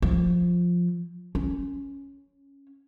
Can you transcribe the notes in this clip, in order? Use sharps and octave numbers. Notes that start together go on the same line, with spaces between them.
F3
C#4